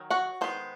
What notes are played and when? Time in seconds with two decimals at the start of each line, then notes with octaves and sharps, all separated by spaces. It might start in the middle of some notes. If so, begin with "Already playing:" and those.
Already playing: D#3 F#3
0.10 F#4 F#5
0.41 D#3 G#3 B3 C5